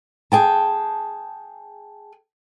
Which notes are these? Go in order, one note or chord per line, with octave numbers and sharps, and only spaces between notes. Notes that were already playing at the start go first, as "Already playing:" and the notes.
G#4 G5 A5